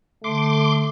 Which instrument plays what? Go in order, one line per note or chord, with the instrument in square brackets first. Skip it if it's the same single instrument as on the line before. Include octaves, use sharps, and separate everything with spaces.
[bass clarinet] D3 [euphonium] A3 [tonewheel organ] C6 D6